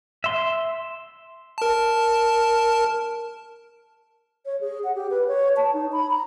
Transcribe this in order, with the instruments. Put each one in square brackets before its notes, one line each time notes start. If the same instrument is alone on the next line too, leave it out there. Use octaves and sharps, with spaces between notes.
[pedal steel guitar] E5 C6
[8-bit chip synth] A#4 A5
[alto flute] C#5
G#4
F#5
G4
B4
C#5
A5
D#4
B5
A#5